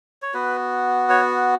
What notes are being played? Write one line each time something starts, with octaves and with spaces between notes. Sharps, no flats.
C#5
B3 F#4 B4
C#5